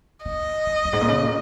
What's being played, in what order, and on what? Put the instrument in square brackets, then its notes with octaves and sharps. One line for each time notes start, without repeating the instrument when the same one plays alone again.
[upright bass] D#3 [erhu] D#5
[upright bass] D#3
F2
G#2
A#2
C#3
A#2